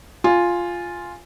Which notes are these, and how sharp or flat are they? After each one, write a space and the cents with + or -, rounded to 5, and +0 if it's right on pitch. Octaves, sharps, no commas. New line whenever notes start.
F4 +0 G#5 +0